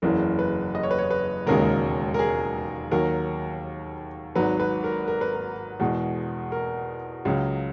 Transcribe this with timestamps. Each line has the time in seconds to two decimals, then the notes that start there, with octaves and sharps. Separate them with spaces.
0.02 F#1 E2 C#3 E3 A#4
0.39 B4
0.75 D#5
0.83 C#5
0.91 B4
0.99 C#5
1.11 B4
1.47 E1 D#2 C#3 G#3 A#4
2.14 A#4
2.19 G#4
2.91 D#2 D#3 F#3 A#4
4.35 G#1 G#2 F#3 B4
4.60 B4
4.84 A#4
5.08 A#4
5.21 B4
5.34 A#4
5.80 E2 B2 G#3
6.52 A#4
7.25 C#2 C#3 F#3